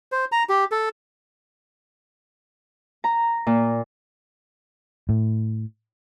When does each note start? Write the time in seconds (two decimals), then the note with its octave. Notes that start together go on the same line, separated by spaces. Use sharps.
0.12 C5
0.32 A#5
0.49 G4
0.72 A4
3.04 A#5
3.47 A#2
5.09 A2